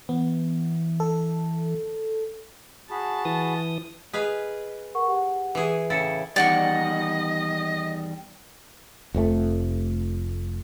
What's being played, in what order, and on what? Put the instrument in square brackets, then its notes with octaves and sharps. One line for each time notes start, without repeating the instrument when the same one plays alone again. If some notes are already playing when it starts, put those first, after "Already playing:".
[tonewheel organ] E3 [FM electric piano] B3
[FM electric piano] A4
[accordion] F#4 G#4 B5 [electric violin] A5
[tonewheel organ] E3 D#6
[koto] G#4 B4 F5 [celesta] D#5 B6
[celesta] A#4 F#5 C#6
G4 F#5
[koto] E3 G#4
[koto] A2 C#3 E4 [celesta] A6 C#7 E7
[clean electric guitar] E2 D#3 G3 [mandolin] D5 F#5 C#6 [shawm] D#5
[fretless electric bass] F1 F2 B2 A3